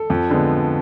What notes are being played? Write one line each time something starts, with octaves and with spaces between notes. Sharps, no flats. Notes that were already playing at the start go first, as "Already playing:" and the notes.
Already playing: A4
F2
D3 G#3 B3